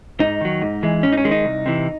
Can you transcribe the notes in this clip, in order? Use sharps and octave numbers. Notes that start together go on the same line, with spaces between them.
G#2 D#4
D#3 F#3
G#2
E3 G#3
G#2 C#4
D#4
C#4
D#3 G#3
D#4
C2
C3 E3